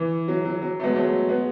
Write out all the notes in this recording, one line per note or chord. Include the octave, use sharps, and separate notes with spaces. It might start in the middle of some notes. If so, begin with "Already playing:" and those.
Already playing: E3
F#3
F#3
F#3
A3
G#3 B3
F#3 A3
G#3 B3